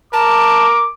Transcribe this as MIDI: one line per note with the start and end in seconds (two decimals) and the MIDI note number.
0.13 0.89 70
0.13 0.66 81
0.13 0.93 86